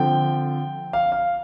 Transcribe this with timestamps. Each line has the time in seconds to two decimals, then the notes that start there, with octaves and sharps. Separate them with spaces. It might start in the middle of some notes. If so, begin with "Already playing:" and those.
Already playing: D3 F3 C4 G5
0.93 F5
1.12 F5